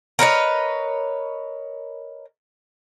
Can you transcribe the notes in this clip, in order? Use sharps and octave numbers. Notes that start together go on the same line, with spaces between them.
A#4 B4 C#5 D#5